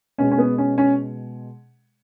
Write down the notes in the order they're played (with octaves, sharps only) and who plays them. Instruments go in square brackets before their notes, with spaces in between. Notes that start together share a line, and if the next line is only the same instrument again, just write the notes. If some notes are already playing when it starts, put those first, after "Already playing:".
[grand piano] B2 G#3 C#4
C#4
B3
C#4
C#4